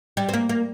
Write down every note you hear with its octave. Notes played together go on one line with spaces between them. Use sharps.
G3
C4
A#3
A#3